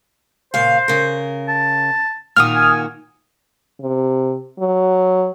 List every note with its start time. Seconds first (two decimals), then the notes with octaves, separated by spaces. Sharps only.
0.54 A#2 C#3 C5 F5
0.88 C#3 A#4
1.48 A5
2.36 A#2 D#3 F#4 D#6 F6
2.55 G#5
3.81 C3
4.59 F#3